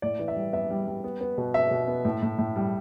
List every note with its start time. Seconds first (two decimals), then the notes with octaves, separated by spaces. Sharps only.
0.02 A2 D5
0.19 E3
0.28 E5
0.36 G3
0.53 B3 E5
0.70 G3
0.87 G3
1.04 B3
1.21 B3
1.38 B2
1.54 B3 E5
1.71 B2
1.88 B3
2.05 A2
2.22 A2
2.39 A2
2.56 G3